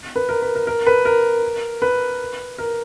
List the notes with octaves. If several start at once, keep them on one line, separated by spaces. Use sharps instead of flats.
B4
A#4
B4
A#4
A#4
B4
A#4
B4
A#4